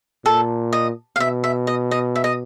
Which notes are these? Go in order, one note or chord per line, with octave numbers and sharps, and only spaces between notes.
A#2 A4
D#5
F5
B2 E5
E5
D#5
D#5
E5
D#5